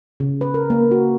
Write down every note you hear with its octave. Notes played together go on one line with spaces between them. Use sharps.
C#3
B4
A#4
A#3
F#4